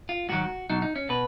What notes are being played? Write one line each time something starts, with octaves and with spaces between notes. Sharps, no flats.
F4
G#2 D#3 F#3 F#4
B2 F#3 D#4
D#4
C#4
B2 B4